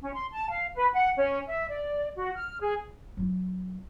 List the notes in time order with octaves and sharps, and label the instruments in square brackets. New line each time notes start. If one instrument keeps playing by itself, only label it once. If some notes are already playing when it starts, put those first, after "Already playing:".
[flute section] C#4
C6
A5
F5
B4
F#5
C#4
E5
D5
F#4
F6
G#4
[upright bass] F#3 E4